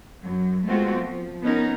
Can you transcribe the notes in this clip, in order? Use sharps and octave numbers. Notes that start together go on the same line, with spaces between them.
F#2 F#3
G#3 A3 B3 C4 F4 F#4
F3
B3 C#4 D#4 A#4